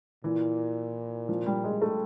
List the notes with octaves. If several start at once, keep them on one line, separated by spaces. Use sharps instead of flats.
A#2 E3
F3
G3
G#3
A3